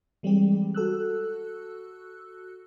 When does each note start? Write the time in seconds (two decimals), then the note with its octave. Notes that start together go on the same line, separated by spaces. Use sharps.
0.23 E3 G3 G#3 C4 G4
0.75 F#4 A4 E6 F#6